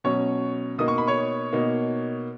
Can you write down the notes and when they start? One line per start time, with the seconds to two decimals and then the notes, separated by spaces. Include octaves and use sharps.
0.04 B2 F#3 C#4 C#5 C#6
0.78 B2 A#3 D#4 D#6
0.88 C#6
0.98 B5
1.08 C#5 C#6
1.53 B2 A#3 D#4